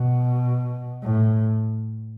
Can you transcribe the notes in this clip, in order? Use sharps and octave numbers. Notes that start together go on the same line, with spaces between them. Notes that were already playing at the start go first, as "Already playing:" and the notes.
Already playing: B2
A2